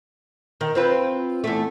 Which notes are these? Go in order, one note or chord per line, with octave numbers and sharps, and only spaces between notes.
D#3
C4 F4 B4
E2 A3